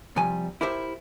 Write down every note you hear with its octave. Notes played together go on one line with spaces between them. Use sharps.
C3 F3 G3 G#5
E4 G4 A#4 C5 E5